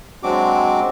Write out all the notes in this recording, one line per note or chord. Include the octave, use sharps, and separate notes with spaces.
F#3 G#3 C4 D4 F#4 D6